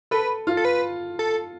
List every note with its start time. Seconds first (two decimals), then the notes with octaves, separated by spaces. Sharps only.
0.11 A4 B4
0.47 F4
0.57 A4
0.65 B4
1.19 A4